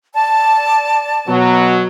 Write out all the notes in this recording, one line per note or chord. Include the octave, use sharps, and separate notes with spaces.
D5 A5
B2 F#3